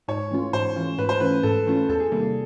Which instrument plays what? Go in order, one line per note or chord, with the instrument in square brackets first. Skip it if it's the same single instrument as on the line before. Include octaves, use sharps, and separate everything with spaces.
[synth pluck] G#2 [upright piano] C#5
[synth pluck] E3 A3 C#4 F4
[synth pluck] G#2 [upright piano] C5
[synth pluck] E3 A3 C#4 F4
[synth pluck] G#2 [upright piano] B4
[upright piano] C5
[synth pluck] E3 A3 C#4 F4 [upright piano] B4
[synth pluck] G#2 [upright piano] A4
[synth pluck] E3 A3 C#4 F4
[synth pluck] E2 [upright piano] A4
[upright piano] G#4
[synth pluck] C3 D#3 G3 A#3